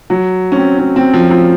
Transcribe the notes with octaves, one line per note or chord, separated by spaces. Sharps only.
F#3
C#4
C4
C#4
C4
F3
F3